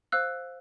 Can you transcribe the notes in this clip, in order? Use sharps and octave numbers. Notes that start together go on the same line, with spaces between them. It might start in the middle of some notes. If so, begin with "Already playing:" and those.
C5 F5 E6 F#6